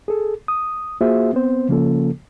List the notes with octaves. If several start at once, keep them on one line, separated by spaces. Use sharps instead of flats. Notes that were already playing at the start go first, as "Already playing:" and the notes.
G#4 A4
D#6
A#3 F4 F#4 G#4 C5 E5
B3 C4 C5
C#3 F3 A#3 C#4 F4 A4